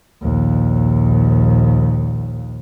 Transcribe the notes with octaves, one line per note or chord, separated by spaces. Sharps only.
A#1 D#2